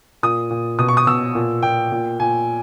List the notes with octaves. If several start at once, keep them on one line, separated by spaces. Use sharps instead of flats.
A#2 D#6
A#2
B2 D#6
C#6
D#6
B2 E6
A#2
A#2 G5
A#2
A#2 G#5